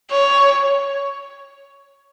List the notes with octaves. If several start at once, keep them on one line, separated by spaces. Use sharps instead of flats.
C#5